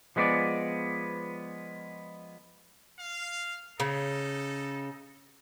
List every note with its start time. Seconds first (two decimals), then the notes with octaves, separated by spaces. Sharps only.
0.16 F3 G#3 B3 F4 D5
2.99 F5
3.80 C#3 D#4 A4